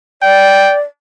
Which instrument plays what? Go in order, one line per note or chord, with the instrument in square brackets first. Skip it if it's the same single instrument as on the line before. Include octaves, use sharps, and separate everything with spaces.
[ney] D5 [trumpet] G5